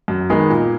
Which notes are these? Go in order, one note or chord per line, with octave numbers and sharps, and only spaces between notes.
F#2
D#3 G#3 B3 D#4
A#2